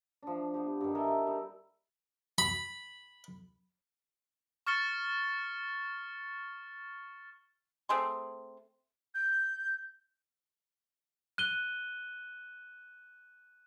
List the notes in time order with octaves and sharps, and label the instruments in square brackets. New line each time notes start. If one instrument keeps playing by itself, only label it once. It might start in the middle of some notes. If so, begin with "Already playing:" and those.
[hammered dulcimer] F3 D4
B3 G4
G2 D#3
A4 A#4 E5 G#5
G3 D#4
[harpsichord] B5
[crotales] C#6 F6 A6 C#7 G7
[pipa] A3 C4 G#4 C6
[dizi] G6
[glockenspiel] F#6 D#7 G7